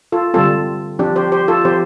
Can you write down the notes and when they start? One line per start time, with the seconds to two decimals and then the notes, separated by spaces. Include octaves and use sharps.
0.12 F4 A4
0.34 D3 G3 C4 F4 A4
0.99 F3 C4 D4 G4
1.16 G4 C5
1.32 G4 C5
1.48 F4 A4
1.65 F3 C4 G4 C5